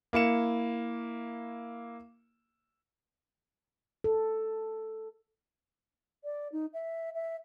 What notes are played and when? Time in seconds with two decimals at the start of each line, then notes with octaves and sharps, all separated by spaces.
0.13 A#3 E4 C#7 E7
4.04 A4
6.24 D5
6.52 D#4
6.73 E5
7.14 E5